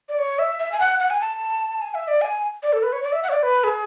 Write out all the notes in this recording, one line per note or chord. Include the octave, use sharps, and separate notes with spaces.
D5
C#5
E5
E5
G#5
F#5
F#5
G#5
A5
G#5
E5
D5
G#5
D5
A4
B4
C#5
D5
E5
F#5
C#5
D5
B4
G#4